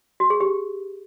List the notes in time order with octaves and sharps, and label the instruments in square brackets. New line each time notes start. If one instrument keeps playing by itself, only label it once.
[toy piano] F#4
G#4
G4